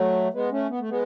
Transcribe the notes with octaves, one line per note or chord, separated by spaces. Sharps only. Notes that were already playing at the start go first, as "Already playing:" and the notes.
Already playing: F#3 A3
G#3 B3
A3 C#4
B3
A3
G#3 B3